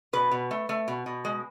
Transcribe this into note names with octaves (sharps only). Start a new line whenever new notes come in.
B2 B4
B2
A3
A3
B2
B2
G#3